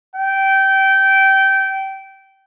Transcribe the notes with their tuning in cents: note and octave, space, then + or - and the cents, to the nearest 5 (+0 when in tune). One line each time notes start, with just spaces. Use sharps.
G5 -20